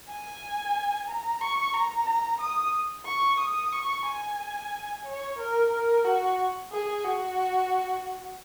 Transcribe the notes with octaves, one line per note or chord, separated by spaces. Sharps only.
G#5
A#5
C#6
A#5
A#5
D#6
C#6
D#6
C#6
G#5
C#5
A#4
A#4
F#4
G#4
F#4